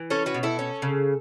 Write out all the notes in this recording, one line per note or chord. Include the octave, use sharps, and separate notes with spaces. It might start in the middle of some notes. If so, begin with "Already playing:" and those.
Already playing: E3
C#4 A4 C#5
F#4 B4
B2
E4 A4
C#4
C#3